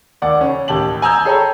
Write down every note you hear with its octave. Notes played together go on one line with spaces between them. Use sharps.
D#2 D5 F#5 D6
C#3 C#4
A1 D#2 G4 A5 F#7
G#5 A#5 D#6 E6 G6 G#6
G#4 A4 C#5 G5 A#5 B5